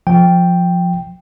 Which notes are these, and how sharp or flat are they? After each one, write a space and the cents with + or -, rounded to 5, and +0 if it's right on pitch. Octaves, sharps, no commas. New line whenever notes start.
F3 +10 G5 +0